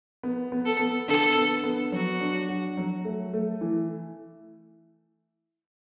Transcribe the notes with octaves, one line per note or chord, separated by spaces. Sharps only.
B3
B3
A4
B3
D3 A4
B3
B3
F#3 F#4
D4
F#4
F#3
A3
A3
E3